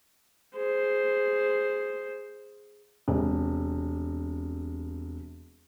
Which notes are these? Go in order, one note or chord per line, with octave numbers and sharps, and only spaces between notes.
G#4 C5
E1 C3